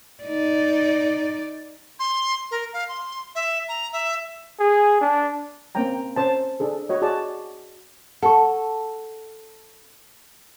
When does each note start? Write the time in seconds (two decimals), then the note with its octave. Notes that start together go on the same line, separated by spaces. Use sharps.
0.23 D#4 D5
1.99 C6
2.51 A#4
2.73 F5
2.88 C6
3.35 E5
3.68 A#5
3.93 E5
4.59 G#4
5.01 D4
5.75 A#3 C4 C#4 G5 A#5
6.16 C#4 C5 A5
6.60 D4 G#4 A4
6.89 F#4 C#5 D#5
7.02 F#4 G#4 D5 A5
8.23 A4 F#5 A5 C#6